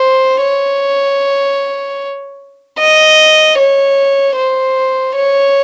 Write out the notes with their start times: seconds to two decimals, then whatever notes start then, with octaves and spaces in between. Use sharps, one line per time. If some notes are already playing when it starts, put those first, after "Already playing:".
Already playing: C5
0.42 C#5
2.79 D#5
3.58 C#5
4.36 C5
5.15 C#5